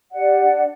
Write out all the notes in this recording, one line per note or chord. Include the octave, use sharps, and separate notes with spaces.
G4 D5 F#5
D4